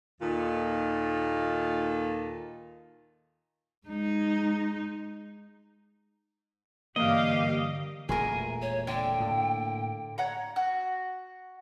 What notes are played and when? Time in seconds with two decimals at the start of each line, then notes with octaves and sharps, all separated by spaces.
0.21 D#2 A#2 D#3 F4 A4
3.87 G#3 D#4
6.96 G2 D3 E3 A#3 G4 D#5 F5
8.09 E1 A#2 A3 G#4 A#4 G#5
8.62 C#5
8.87 D3 G5
9.20 A2 A#3
10.18 C#5 F#5 A#5
10.56 F#4